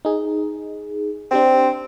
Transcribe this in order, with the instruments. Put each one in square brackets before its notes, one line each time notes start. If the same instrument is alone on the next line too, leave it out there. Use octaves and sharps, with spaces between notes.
[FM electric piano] D#4 G#4
[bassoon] C4 [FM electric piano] D4 G4 C5